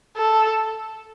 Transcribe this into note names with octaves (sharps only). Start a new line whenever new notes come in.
A4